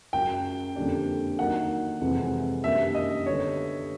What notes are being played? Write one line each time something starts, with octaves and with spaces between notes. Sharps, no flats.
F#2 C#3 F#3 G5
F2 D3 G3 A#3 D4
D#3 F#3 A#3 D#4 F#5
F2 C3 E3 G#3
F#2 D#3 G3 A#3 D4 E5
D#5
D3 G3 B3 C#5